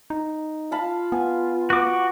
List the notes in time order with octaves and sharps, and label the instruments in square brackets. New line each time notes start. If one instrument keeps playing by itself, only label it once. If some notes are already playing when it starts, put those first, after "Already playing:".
[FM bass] D#4
[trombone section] F4 [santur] F5 A5 B5
[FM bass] B3 [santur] G#5
[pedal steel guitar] F#4 D6 [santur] B4